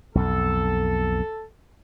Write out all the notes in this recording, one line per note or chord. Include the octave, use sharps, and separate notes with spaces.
B1 F2 A4